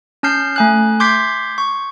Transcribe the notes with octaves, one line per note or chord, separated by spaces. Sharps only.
C#4 A5 F6 G6 C7
A3 G#5 F#6
C6 D6 G6 G#6 B6 C7
C#6